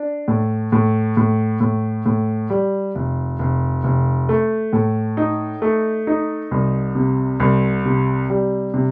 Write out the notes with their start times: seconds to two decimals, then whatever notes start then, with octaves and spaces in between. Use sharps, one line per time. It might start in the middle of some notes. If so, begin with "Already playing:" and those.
Already playing: D4
0.28 A2
0.72 A2
1.17 A2
1.60 A2
2.06 A2
2.50 G3
2.95 F1
3.39 F1
3.84 F1
4.29 A3
4.73 A2
5.17 D#4
5.62 A3
6.07 D#4
6.51 C2
6.95 C3
7.40 C2
7.85 C3
8.30 G3
8.74 C3